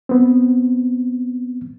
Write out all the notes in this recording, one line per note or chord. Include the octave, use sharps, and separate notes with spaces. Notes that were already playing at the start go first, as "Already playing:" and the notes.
B3 C4